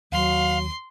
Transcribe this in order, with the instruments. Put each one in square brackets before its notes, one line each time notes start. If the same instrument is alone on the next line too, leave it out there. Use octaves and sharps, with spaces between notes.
[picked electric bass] D#2 [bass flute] F#3 [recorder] F5 [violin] C6